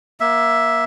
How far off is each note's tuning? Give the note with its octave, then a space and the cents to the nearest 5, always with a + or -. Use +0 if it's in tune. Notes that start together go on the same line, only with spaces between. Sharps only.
A#3 +25 E5 +0